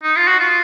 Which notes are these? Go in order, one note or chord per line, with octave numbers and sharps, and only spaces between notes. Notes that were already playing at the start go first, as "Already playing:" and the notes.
D#4
F4
F#4
F4